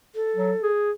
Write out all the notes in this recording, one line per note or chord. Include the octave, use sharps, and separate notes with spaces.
A4
F#3
G#4